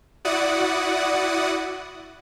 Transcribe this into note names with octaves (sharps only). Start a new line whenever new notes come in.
E4 F#4 D5 F#5 D#6